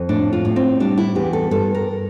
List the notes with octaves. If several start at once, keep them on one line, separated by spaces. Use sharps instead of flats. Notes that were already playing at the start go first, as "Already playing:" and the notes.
Already playing: F2
A2 D4
F4
A2
C4
G3 D4
E4
E2 G4
A4
G2 A4
A#4